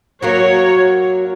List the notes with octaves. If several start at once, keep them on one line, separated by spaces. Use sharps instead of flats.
F#2 F#3 A#3 F#4 C#5